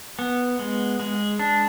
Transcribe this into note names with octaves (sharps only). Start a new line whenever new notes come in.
B3
G#3
G#3
D4